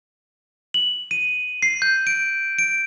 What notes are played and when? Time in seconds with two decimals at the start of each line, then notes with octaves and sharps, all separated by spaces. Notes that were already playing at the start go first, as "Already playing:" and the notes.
0.74 F#7
1.11 D#7
1.63 C7
1.82 G6
2.07 D7
2.59 D7